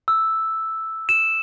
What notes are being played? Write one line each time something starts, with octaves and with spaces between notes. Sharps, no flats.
E6
E7